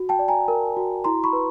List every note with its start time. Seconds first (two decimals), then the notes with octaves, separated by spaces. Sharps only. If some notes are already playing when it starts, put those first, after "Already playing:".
Already playing: F#4
0.09 G5 A5
0.19 D5
0.28 G#5 A#5
0.48 A#4
0.77 F#4
1.04 E4 A#5 C6
1.24 B5 C#6
1.33 B4